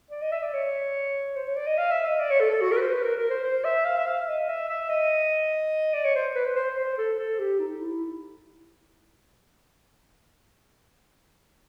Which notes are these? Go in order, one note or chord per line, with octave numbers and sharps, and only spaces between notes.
D5
D#5
E5
D5
C#5
C5
C#5
D5
D#5
F5
E5
D#5
D5
C#5
A4
A4
F#4
A#4
B4
C5
B4
A#4
A#4
C5
C5
E5
F5
E5
F5
D#5
E5
E5
D#5
D5
C#5
C5
B4
C5
C5
C5
A4
A4
G4
D#4
E4